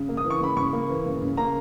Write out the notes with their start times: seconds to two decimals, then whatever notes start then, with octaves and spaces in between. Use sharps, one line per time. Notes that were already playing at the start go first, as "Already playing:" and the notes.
Already playing: C#3
0.09 A#3
0.17 D#6
0.25 E3
0.30 C#6
0.41 C#3 B5
0.57 C#3 C#6
0.73 A#3
0.89 E3
1.06 C#3
1.21 C#3
1.37 A#3 A#5